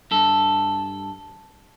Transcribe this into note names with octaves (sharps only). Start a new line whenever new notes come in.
G2 A4